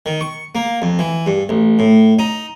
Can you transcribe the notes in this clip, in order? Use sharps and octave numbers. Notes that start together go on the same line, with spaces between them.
D#3
C#6
A#3
F2
E3
G2
A1
A2
D#4